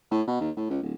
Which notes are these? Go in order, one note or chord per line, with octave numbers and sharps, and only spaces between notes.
A2
B2
D#2
A2
C#2
D1